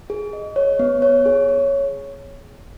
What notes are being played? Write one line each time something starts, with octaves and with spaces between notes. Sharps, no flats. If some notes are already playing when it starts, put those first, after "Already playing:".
G#4
D#5
C#5
B3
C#5
G#4
C#5